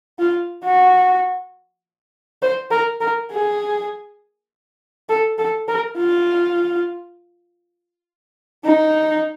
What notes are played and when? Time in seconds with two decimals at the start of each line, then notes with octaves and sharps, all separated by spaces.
0.19 F4
0.64 F#4
2.42 C5
2.71 A#4
3.01 A#4
3.32 G#4
5.09 A4
5.38 A4
5.68 A#4
5.99 F4
8.65 D#4